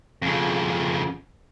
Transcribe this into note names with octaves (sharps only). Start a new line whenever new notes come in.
F2 C#3